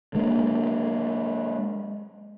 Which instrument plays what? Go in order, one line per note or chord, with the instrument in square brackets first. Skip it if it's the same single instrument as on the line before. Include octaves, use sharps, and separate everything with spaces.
[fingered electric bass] G#3 A#3 D4